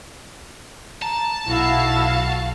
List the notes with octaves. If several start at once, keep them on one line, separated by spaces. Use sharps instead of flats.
A5 A#5
B1 E4 F#4 F5